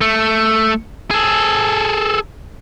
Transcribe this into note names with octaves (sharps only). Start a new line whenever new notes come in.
A3
G#4 A4